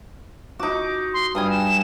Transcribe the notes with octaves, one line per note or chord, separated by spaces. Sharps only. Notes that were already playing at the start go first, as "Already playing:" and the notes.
D#4 F#4 D6
C6
G2 G3 G#5 D#6
E7